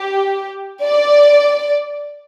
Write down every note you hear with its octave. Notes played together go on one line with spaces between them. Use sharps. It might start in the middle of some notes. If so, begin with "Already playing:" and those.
Already playing: G4
D5